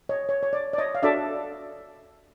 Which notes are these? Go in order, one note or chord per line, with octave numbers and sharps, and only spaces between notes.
C#5 D#5
C#5
C#5
D5
D5
C#5 D#5
F5
D4 F#4 A4 D5 E5